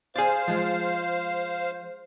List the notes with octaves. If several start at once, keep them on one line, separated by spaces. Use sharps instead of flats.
G#4 C5 D5 F5
F3 G#3